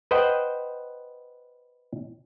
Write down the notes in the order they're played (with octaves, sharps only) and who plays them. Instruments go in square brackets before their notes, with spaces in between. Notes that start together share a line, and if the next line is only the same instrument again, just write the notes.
[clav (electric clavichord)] B4 C5 D#5 F#5 G5